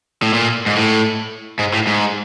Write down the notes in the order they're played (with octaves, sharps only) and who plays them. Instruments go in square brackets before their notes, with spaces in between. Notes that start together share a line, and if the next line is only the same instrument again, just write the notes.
[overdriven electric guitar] A2
A#2
G#2
A2
G#2
A2
G#2